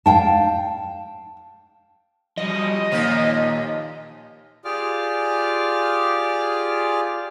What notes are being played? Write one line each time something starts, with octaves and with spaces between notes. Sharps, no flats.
F5 G5 A5
F3 G3 D#5
D#2 A#2 F3 D#4
F4 G4 G#4 D5 D6 F6